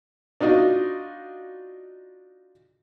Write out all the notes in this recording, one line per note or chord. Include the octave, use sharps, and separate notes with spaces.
D4 D#4 F4 F#4 D#5